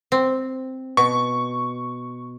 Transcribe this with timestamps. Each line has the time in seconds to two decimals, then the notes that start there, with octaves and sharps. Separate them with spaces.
0.12 C4
0.97 B2 C#6